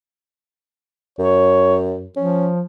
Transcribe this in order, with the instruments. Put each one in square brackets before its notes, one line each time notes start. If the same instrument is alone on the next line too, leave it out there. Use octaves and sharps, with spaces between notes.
[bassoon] F#2 [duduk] C#5
[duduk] F3 [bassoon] C#4